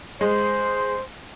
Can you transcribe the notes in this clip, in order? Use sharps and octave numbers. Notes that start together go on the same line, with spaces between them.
G#3 C5